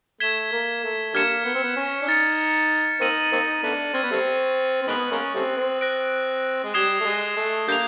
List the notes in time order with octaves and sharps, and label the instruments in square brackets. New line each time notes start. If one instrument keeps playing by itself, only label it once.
[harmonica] A3 [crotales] G#6 B6 E7 G7
[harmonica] A#3
A3
[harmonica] D3 G3 A#3 [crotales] F6 G#6 C#7 E7
[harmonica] B3
C4
B3
C#4
D4
[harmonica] D#4 [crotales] F6 A6 C#7
[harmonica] A#3 C4 D#4 [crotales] F6 A#6 D#7 F#7
[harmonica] A#3 C4 D#4
A3 B3 D4
[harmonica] C4 [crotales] C#6 F6 G#6
[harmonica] B3
G3 A3 C4
C4
[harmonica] D#3 G#3 B3 [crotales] D#6 F#6 A#6 D7 F#7
[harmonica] G#3 A#3 C#4
G3 A3 C4
C4
[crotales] F#6 A#6 D7
[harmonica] G#3
[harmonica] G3 [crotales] D#6 G#6 C7 E7 G7
[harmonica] A3
G#3
A3
[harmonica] D3 G3 A#3 [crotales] G6 C7 F7